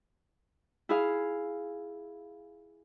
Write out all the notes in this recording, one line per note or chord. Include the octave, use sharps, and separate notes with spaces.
E4 G#4 F5